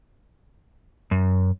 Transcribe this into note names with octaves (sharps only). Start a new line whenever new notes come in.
F#2